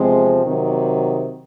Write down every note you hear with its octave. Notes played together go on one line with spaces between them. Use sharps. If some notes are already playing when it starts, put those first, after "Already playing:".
Already playing: E2 C3 F3 G#3 C4
C3 D#3 F#3